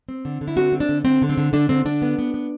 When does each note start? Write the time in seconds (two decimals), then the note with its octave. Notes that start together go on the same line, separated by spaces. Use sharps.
0.09 C4
0.25 D3
0.41 D3
0.48 E4
0.56 C4 F#4
0.72 C4
0.80 D4
0.89 D3
1.05 D3 C4
1.22 D3
1.29 C4
1.38 D3
1.53 D3 D4
1.69 D3 C4
1.85 D3 D4
2.02 B3
2.19 B3
2.34 B3